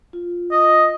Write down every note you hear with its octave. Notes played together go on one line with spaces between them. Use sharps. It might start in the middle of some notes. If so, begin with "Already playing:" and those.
F4
D#5